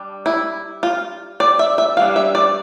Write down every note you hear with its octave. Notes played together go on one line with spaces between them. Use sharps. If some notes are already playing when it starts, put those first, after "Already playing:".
Already playing: G3 D4
E4
F4
D5
E5
E5
E3 G3 D4 F5
E5
D5